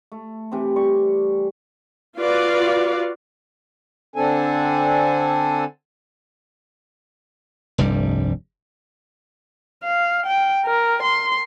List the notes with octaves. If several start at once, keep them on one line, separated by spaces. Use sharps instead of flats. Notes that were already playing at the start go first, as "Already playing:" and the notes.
A3
C3 E3 C4
G3 C#6
F4 F#4 B4 D5 F5
D3 C4 D4 A4 G#5
F1 C2 G2 G3
F5
G5
A#4
C6